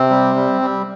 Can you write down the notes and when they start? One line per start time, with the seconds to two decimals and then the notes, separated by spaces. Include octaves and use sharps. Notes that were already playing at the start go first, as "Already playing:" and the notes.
Already playing: C3 C4
0.10 G3
0.36 G3
0.62 G3